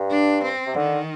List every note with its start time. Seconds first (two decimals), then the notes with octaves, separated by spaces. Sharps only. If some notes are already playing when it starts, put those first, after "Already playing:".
Already playing: G2
0.08 D4
0.42 C4
0.67 C3
0.75 D3 D#3